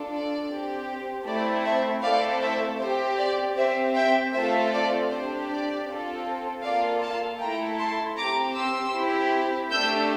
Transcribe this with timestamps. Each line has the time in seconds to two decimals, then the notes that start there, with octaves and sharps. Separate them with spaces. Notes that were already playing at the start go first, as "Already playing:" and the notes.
Already playing: D4 F4 A4
0.12 D5
0.50 C4 G4
1.26 A3 C4 E4 D5
1.65 C5 E5
2.03 A3 C4 E4 A4 D5 F5
2.42 C5 E5
2.80 C4 G4 C5
3.19 D5
3.56 C4 G4 C5 E5
3.95 E5 G5
4.33 A3 C4 F4 A4 C5 E5
4.73 D5
5.11 D4 G4 C5
5.49 D5
5.88 C4 F4 A4
6.64 A#3 F4 A4 D5 F5
7.02 F5 A5
7.40 A3 E4 A4 G5 A#5
7.79 A5 C6
8.17 C4 G4 A#5 D6
8.55 C6 E6
8.94 C4 E4 G4
9.70 A3 D4 G4 E6 G6